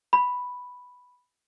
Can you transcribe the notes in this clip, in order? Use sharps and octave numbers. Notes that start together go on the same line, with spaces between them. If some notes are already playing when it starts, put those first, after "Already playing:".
B5